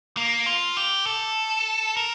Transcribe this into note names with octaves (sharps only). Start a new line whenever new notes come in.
A#3
F4
G4
A4
A#4